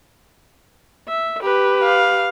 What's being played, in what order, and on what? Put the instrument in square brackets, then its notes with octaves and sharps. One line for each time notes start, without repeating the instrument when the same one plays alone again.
[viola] E5
G4 B4
[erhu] F5